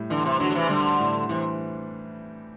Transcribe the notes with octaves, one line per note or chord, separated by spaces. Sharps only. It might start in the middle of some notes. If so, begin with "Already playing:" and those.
Already playing: A2 G3
D3 E3
C3
D3 F#3 D4
F#3
C3 E3
D3 G3
A2
C3 E3